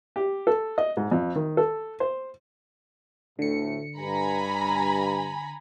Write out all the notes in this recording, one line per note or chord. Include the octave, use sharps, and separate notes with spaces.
G4
A4
D#5
G#2
F2
D#3
A4
C5
D2 A2 D3 A3 C#7
G2 G#5 A#5 B5